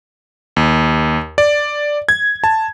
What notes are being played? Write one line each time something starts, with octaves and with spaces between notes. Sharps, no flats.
D#2
D5
G#6
A5